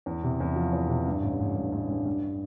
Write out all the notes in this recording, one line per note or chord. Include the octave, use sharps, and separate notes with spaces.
E2
C3
E2
F3
E2
C3
G2
A1
A1
G2
A1
G2
G2